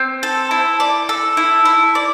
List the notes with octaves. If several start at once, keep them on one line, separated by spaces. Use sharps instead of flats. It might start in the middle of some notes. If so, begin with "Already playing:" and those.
Already playing: C4
A4
E4
D5
A4
E4
E4
D5